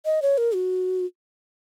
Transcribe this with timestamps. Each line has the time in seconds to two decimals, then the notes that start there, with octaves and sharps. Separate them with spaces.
0.05 D#5
0.22 C#5
0.38 A#4
0.54 F#4